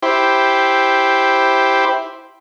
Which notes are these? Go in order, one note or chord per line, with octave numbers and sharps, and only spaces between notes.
E4 G4 C5